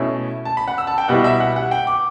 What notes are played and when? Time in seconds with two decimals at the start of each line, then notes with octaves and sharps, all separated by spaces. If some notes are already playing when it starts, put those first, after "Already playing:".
Already playing: B2 A3 C#4 E4
0.45 A5
0.57 B5
0.68 F#5
0.78 E6
0.87 A5
0.98 G5
1.08 B2 G3 B3 E4 F#5
1.24 E5
1.40 F#5
1.56 F#5
1.71 G5
1.87 D6